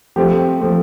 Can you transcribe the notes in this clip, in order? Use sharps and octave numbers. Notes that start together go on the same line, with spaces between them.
F3 A3 C4 G4
F3 A3 C4